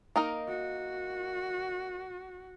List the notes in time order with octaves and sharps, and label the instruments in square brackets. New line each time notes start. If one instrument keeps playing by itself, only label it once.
[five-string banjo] A#3 D#4 A#4
[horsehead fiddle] F#4